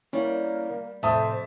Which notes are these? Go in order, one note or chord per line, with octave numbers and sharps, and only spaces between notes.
G3 A#3 C#4 E4 C#5
F2 A2 C3 C5 E5 A5 D#6